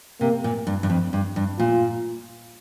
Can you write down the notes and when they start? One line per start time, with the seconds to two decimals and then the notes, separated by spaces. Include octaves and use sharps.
0.21 C3 A#3
0.44 A#2
0.67 G2
0.83 G2
0.90 F2
1.13 G2
1.36 G2
1.59 A#2 F4